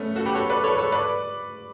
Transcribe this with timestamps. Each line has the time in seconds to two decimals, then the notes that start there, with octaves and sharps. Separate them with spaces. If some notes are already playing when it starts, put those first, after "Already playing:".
Already playing: A3 B3 C#4
0.16 F#4 A4
0.26 G4 B4
0.35 A4 C#5
0.49 B4 D5
0.64 A4 C#5
0.72 B4
0.78 A4 C#5
0.92 B4 D5